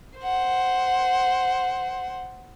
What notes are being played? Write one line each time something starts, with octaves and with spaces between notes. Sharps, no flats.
C5 F#5